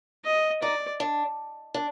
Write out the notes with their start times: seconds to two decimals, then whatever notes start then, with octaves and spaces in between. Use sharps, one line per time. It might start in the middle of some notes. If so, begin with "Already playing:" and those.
0.25 D#5
0.62 D#4 D5
1.00 D4
1.74 D4